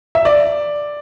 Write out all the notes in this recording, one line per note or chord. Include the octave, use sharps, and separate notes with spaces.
E5
D5